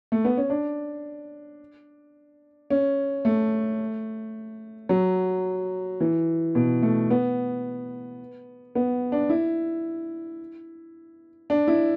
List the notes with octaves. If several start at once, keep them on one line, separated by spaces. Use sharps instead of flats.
A3
B3
C#4
D4
C#4
A3
F#3
E3
B2
A3
B3
B3
D4
E4
D4
E4